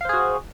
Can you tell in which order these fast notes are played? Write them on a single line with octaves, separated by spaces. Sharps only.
F5 C5 G#4 F#4